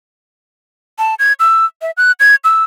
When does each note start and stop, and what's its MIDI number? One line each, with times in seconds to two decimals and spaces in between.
0.99 1.15 81
1.19 1.33 92
1.40 1.65 88
1.82 1.91 76
1.97 2.12 90
2.20 2.35 92
2.44 2.64 88